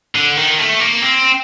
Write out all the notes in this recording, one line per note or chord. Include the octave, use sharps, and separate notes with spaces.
D3
D#3
A3
A#3
C4